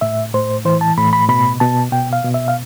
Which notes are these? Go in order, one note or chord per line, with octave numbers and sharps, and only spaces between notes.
A2 E5
A2 C5
E3 C5
A5
A2 B5
B5
B2 B5
B2 A5
B2 G5
F5
B2
E5
F5